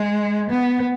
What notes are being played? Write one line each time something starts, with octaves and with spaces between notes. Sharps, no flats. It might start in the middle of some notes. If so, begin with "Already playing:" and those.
Already playing: G#3
B3